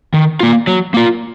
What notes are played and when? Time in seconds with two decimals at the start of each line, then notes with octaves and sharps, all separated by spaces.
0.14 D#3
0.40 A#3 F4
0.67 F#3
0.94 A#3 F4